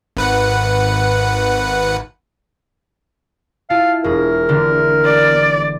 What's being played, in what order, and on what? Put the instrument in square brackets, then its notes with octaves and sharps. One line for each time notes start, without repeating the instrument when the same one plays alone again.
[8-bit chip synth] G#1 B4 F#5
[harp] E4 F4 A5 [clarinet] F5
[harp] E1 G#4 [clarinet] A#4
[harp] D3 E3 A#3
[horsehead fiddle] D5